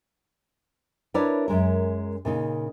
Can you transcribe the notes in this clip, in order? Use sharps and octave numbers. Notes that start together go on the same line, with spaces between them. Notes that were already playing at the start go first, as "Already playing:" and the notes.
D4 E4 A#4 B4 C#5 D5
F#2 G#3 A#4
A#2 C#3 D#4